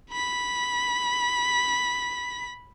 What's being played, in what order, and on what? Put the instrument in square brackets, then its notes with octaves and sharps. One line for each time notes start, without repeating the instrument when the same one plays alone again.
[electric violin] B5 B6